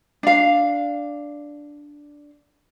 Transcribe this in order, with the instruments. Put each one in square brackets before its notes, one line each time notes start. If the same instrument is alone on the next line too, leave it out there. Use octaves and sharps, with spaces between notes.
[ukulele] D4 F5